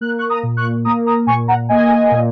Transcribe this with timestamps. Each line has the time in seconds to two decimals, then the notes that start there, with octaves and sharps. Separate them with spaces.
0.01 A#3 F#6
0.18 C#6 F#6
0.29 A#5 D#6
0.43 A#2
0.57 C#6 F#6
0.85 A#3 A#5 D#6
1.06 A#5 D#6
1.27 A#2 G#5 C#6
1.48 F#5 A#5
1.69 A#3 D#5 G#5
2.11 A#2